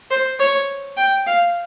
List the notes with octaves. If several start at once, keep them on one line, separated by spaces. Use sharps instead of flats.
C5
C#5
G5
F5